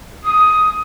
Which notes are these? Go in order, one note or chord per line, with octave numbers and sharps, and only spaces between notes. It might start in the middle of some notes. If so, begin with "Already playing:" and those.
D#6